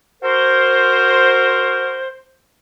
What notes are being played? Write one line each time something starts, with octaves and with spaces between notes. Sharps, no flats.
F#4 A#4 C5